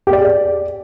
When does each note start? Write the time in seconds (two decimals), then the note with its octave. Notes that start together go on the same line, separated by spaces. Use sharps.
0.07 G4
0.13 D5
0.19 G#4
0.25 D5